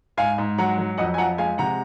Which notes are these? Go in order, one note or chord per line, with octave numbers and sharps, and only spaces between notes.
G#2 F5 G#5
G#2
F#3 F#5 A#5
F#3
F2 D#5 F#5
G#5
F3 F#5 A#5
G#3 F5 G#5
C3 F#5 A#5